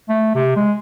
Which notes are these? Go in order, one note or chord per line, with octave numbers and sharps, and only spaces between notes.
A3
C3
G#3